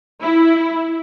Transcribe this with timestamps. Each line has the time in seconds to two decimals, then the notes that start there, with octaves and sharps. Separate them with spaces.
0.21 E4